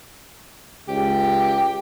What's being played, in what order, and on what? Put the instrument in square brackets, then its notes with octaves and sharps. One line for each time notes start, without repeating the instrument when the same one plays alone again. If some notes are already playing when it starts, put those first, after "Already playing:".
[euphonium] C#2 [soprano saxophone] G4